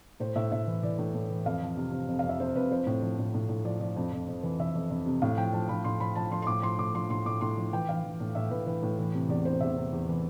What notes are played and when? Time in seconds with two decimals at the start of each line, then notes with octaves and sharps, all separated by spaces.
0.20 A2 C5
0.36 A2 E5
0.52 A2 E5
0.67 E3
0.83 E3 D5
0.98 A2
1.14 A2
1.30 E3
1.46 F2 F5
1.62 F3
1.77 C3
1.92 C3
2.08 F2
2.19 F2 F5
2.29 E5
2.40 C3 C5
2.55 F2 B4
2.71 F3 C5
2.86 A2
3.03 F3
3.18 A2
3.34 A2
3.49 A2
3.65 F3 D5
3.81 F3 D5
3.96 F2
4.12 F2
4.28 F2
4.43 E3
4.59 E3 E5
4.75 F2
4.90 F2
5.06 C3
5.22 A2 F5
5.38 F3 G5
5.53 F3 A5
5.69 F3 B5
5.84 A2 C6
6.00 F3 B5
6.15 F3 A5
6.31 F3 C6
6.42 C6
6.47 A2 D6
6.62 F3 C6
6.78 A2 D6
6.94 F3 C6
7.10 A2 C6
7.26 A2 D6
7.41 A2 C6
7.57 F3
7.73 E3 G5
7.89 E3 F5
8.04 E3
8.20 A2
8.35 A2 E5
8.51 A2 B4
8.66 E3 B4
8.83 A2
8.99 E3
9.14 C3
9.29 E2 D5
9.45 C3 C5
9.60 E2 E5
9.76 C3
9.92 E2
10.08 E3